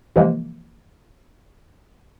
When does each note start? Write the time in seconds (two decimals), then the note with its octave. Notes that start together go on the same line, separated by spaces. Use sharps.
0.16 C3 E3 F3 G#3 A#3